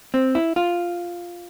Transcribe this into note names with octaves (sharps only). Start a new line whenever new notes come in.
C4
E4
F4